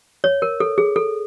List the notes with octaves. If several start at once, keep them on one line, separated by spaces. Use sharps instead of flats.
C#5
A#4
A4
G#4
A4